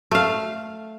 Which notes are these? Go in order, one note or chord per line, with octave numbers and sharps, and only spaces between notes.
A3 F5